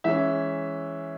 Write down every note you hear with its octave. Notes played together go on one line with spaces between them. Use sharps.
E3 G#3 C#4 E5